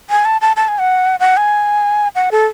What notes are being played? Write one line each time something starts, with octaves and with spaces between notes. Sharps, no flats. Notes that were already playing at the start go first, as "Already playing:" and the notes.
G#5
A5
A5
A5
G#5
F#5
F#5
G#5
F#5
A4